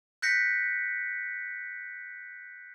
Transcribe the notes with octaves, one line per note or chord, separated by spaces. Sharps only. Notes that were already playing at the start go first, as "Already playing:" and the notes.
F#6 G6 A#6 B6 C#7